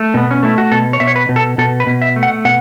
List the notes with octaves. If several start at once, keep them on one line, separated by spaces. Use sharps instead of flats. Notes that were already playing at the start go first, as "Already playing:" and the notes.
Already playing: A3
B2 B3
C#4
A3 E4
F#4
B2 A4
C#5
B2 E5
C#5
B4
B2
A4
B2 A4
B4
B2
E5
A3
F#5
B2 F#5